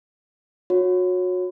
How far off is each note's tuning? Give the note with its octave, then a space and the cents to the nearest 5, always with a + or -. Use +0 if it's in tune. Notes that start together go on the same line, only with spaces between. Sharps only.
F#4 -30 C#5 -10